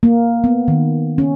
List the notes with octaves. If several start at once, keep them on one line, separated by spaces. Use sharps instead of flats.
A#3
B3
D#3
C#4